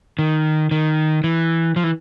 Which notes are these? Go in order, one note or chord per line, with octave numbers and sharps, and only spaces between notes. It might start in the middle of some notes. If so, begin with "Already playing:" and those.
D#3
D#3
E3
F3
E3